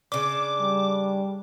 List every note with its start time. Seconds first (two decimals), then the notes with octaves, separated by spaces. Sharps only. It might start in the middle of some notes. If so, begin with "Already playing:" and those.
0.12 C#3 D4 D6
0.61 G3